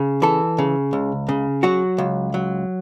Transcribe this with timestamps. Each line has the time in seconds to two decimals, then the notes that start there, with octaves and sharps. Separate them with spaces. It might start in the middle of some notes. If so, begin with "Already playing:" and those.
Already playing: C#3
0.22 E3 A4
0.58 C#3
0.93 C#2
1.29 C#3
1.63 F#3 F#4
1.98 C#2
2.34 F#3